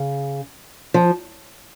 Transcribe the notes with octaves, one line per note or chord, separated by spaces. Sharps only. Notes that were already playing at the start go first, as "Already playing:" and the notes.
Already playing: C#3
F3